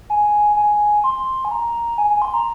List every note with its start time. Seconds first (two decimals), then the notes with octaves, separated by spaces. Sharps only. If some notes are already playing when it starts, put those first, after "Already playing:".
0.10 G#5
0.57 G#5
1.04 C6
1.45 G#5
1.51 A#5
1.98 G#5
2.10 G#5
2.22 C6
2.34 A#5